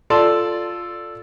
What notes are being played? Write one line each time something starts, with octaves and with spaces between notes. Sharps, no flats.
F4 A4 D5 A5 C6